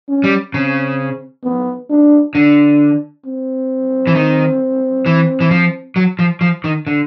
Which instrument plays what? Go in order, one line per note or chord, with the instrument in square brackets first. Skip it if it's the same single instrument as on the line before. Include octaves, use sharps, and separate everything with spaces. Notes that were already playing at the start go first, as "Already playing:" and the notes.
[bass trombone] C#4
[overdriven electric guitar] G3
[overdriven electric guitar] C#3 [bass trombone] C4
[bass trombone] B3
D4
[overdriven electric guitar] D3 [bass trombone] D4
[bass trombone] C4
[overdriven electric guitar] E3
D#3
E3
E3
F3
F#3
F3
F3
D#3
D3